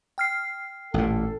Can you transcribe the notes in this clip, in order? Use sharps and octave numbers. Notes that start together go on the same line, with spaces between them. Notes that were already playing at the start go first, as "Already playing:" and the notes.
G5 F6 C7
A1 A#2 A4